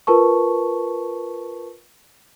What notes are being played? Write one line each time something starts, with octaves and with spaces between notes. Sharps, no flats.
F4 A#4 B4 A5 C#6